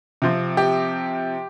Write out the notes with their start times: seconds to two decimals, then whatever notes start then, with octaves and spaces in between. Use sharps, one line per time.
0.22 C3 F3 C4
0.57 G4